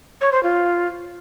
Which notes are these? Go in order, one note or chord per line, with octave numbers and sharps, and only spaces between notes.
C#5
C5
F4